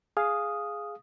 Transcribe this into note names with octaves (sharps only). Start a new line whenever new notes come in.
G#4 F5 D#6